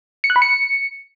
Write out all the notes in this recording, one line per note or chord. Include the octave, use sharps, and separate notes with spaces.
C#7
F#6
B5
C#7